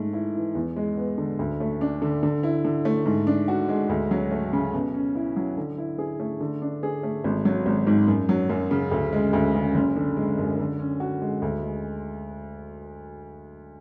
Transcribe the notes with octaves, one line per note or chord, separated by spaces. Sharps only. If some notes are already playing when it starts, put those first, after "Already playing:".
Already playing: G#2 A3
E4
E3
E2
G#3
B3
D3
D2
A3
D4
D3
D3
E4
D3
A3
G#2
D4
F#4
G#3
D2
F#3
A3
C#3
B2
C#4
E4
F#3
D3
E4
G#4
A3
D3
D4
G#4
A3
G#1
F#3
G#1
G#2
F#2
F#3
F#2
C#3
D2
G#3
D2
C#3
F#1
D3
G#3
F#2
D3
C#4
F#4
G#3
D2
G#3